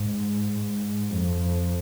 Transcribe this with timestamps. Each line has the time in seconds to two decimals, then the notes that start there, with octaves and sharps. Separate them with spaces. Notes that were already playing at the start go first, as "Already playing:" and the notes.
Already playing: G#2
0.58 G#2
1.12 F2